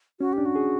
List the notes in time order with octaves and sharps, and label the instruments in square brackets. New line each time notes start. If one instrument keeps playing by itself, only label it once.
[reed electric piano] C#4 [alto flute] F#4
[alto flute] G4
[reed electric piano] D4
[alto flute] F#4
[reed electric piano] G#4